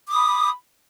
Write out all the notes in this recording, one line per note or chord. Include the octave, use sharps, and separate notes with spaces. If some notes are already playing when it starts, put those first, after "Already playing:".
B5 D6 D#6